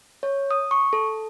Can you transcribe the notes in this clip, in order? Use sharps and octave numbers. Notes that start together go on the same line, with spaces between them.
C#5
D#6
C#6
A4